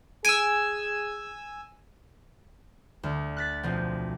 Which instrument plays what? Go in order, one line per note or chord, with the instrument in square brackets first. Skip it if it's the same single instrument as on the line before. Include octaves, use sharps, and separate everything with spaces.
[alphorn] G#4 [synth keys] G#5 E6 [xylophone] D7 D#7
[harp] D2
F#6 A6 B6
B1 F3 C4